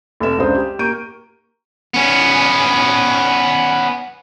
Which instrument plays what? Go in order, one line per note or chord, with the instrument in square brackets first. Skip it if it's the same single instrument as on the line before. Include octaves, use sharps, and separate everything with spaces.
[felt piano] F1 A4 B4 E5 E7
C#2 C#3 G#3 D4 C5 D#6
G4
A#3 G4 C#6 G6 D7 D#7
[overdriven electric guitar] B3 C#4